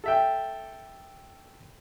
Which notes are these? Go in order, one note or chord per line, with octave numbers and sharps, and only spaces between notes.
A4 E5 G5